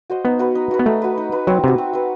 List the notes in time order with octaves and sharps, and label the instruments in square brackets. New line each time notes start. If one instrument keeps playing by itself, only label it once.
[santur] F#4 C5 D#5
[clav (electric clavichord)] B3 [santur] D#4
[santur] F#4 B4
D#4
F#4 B4
[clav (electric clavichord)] B3
[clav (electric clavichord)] A3 [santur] D#4
[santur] F#4 B4
D#4
F#4 B4
[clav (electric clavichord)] F#3 [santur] C4
[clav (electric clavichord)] C3 [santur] F#4 B4
[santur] C4
F#4 B4